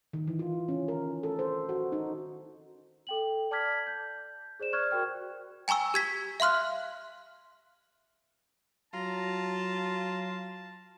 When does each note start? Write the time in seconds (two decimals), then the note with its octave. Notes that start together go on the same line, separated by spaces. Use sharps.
0.13 D#3
0.28 E3
0.39 F4
0.68 C#4
0.88 A#4
1.23 A4
1.39 C5
1.69 F#4
1.92 D#4
3.07 A4 G5 F#7
3.51 D5 A5 D6 F6 G#6 B6
3.87 G6
4.60 G#4 C5 D5 E7
4.73 C5 D5 C#6 F6 F#6 G#6
4.91 F#4 A#4 G5 F6
5.68 G5 G#5 A#5 C#6 E6
5.94 G4 G#6 B6
6.40 E5 F5 C6 F6 F#6
8.94 F#3 F4 A5 A#5